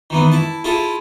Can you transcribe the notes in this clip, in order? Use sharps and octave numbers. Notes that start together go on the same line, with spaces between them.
D#3 E3 B3
E4 A5
E4 F4 G#4 A4